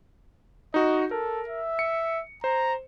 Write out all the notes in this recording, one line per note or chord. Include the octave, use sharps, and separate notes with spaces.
D#4 F#4 D#5
A4 A#4
E5
C#7
C5 A#5